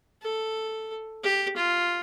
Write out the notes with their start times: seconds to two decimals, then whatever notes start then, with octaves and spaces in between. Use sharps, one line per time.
0.22 A4
1.23 G4
1.57 F4